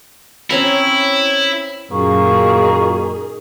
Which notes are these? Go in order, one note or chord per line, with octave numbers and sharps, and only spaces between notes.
C4 C#4 E4 A#5
F#2 A#2 D#3 A#3 G#4 C#6